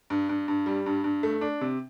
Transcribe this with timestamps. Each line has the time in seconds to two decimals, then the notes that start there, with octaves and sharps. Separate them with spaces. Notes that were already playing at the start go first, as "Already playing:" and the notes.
0.10 G2
0.29 G2
0.48 G2
0.66 G3
0.86 G2
1.04 G2
1.23 A3
1.41 D4
1.61 C3